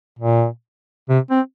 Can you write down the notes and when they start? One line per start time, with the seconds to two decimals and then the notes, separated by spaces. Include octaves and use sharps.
0.19 A#2
1.09 C3
1.31 C4